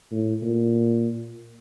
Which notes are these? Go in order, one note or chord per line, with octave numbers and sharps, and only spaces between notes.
A2
A#2